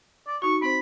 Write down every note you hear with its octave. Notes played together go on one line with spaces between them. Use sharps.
D5
D#4 F#4 C#6
C4 C5 B5